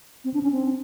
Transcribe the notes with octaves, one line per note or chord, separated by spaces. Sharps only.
C4
D4
C#4
C4